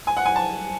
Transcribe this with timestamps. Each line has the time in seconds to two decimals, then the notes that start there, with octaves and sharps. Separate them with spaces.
0.07 G#5
0.17 F#5
0.25 G#5
0.36 A5